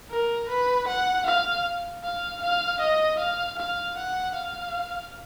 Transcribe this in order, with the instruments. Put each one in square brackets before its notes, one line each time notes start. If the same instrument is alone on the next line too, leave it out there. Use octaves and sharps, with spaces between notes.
[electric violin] A#4
B4
F#5
F5
F5
F5
D#5
F5
F5
F#5
F5